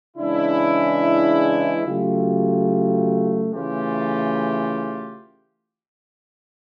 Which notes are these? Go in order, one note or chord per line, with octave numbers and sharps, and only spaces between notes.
C#3 E3 G#3 D4 E4
C#3 F#3 A3 F4 G4
C#3 E3 A3 F4 G4